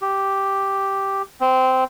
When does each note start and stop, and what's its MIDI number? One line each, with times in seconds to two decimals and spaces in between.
0.02 1.22 67
1.41 1.84 60